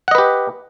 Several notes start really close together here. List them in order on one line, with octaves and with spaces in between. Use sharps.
F#5 D#5 B4 G4